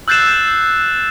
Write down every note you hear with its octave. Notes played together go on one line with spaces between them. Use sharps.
E6 F#6 G6 A6 C7 E7